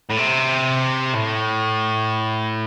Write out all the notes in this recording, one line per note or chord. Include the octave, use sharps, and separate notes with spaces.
A2
C3
A2